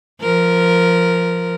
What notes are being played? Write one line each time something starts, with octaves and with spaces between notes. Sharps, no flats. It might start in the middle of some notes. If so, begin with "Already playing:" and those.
F3 A#4